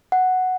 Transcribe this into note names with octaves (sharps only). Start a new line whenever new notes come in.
F#5